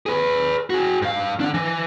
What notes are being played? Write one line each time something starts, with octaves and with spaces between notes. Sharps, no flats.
G#4 B4
F#4 G#4
G2 F5
D4 F#5
E3